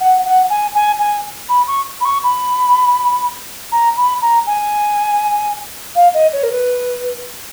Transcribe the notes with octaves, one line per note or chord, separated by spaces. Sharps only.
F#5
F#5
G#5
G#5
G#5
B5
C#6
B5
C#6
B5
A#5
B5
A#5
G#5
F5
D#5
C#5
A#4
B4